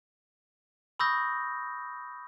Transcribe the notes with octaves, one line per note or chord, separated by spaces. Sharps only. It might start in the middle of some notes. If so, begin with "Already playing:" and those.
B5 C#6 D#6 E6 G6 A#6